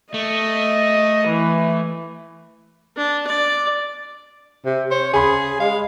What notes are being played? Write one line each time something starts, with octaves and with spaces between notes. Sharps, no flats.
A3 D#5
E3
D4
D5
C3
C5 C#5
C#3 G#4 G#5 B5 C6
G#3 F5